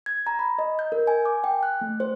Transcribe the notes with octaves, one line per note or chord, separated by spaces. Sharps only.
G#6
A#5
B5
D#5
G6
A#4
G#5
D6
G5
F#6
A3
C5